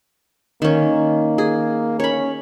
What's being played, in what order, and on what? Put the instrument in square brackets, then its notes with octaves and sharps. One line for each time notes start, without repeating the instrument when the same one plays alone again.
[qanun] D#3 C#4 [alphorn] A#3
[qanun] G#4
[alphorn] C#4 [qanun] C#5 B5